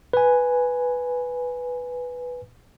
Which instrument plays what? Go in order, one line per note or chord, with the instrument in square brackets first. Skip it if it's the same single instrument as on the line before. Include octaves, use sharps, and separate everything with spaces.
[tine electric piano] B4 G#5